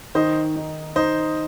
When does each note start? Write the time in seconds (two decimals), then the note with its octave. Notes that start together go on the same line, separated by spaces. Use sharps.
0.15 D#3 C5 D#5
0.56 D#4
0.96 D#4 C5 D#5